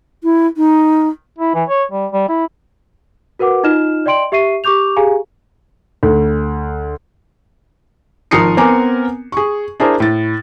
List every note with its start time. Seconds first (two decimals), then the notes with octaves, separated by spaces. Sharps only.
0.23 E4
0.57 D#4
1.39 E4
1.55 E3
1.69 C#5
1.92 G3
2.12 G3
2.29 E4
3.39 F#4 A#4 B4 F#5 D6
3.64 D#4 F4 D#5 F6 E7
4.06 D5 D#5 G5 C6 D7 F#7
4.32 G4 E5 C#6 C7 D#7
4.64 G4 C#6 D6 G6 F7
4.97 G4 G#4 F5 G#5 A#5
6.03 D2
8.31 G#1 F3 A#4 D#6 C7 C#7
8.57 B3 C4 A#4 G#5 D6
9.32 G#4 C#6
9.80 D4 E4 G#4 A#4 C5
10.00 A2 A6